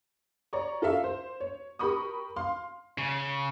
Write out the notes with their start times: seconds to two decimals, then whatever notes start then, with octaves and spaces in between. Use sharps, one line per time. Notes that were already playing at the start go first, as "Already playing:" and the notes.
0.53 C#5 D5 A#5 C#6
0.82 F4 A4 A#4 E5 F5
1.04 C5
1.40 C#5
1.79 G4 A#4 B5 C#6 D#6
2.36 F5 C6
2.98 C#3